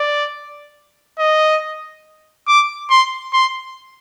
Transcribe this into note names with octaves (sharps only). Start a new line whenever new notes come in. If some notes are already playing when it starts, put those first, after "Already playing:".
Already playing: D5
D#5
D6
C6
C6